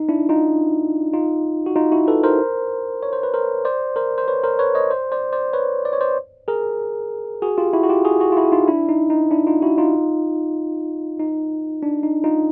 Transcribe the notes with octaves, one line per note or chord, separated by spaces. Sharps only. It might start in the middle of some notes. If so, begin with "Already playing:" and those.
Already playing: D#4
D4 E4
D#4 F4
D#4 F4
F#4
D#4 F4
E4 F#4
A4 B4
A#4 C5
C#5
C5
B4
A#4 C5
C5 D5
A#4 C5
C5
B4 C#5
A#4 C5
B4 C#5
C#5 D#5
C5 D5
C5 D5
C5 D5
B4 C#5
D5
C#5
C5 D5
G#4 A#4
F#4 G#4
F4 G4
E4 F#4
F#4
F4 G4
F#4 G#4
F#4 G#4
F4
E4 F#4
D#4 F4
D4 E4
D#4
D#4
D4 E4
D#4 F4
E4 F#4
D#4 F4
D#4
D4
D#4
D#4 F4